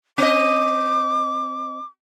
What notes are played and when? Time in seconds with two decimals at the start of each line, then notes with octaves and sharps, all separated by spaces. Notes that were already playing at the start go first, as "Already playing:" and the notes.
0.18 C4 D#5 D6